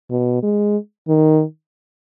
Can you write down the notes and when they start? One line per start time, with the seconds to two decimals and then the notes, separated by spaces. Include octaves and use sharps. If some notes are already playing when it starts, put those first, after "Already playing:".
0.11 B2
0.43 G#3
1.08 D#3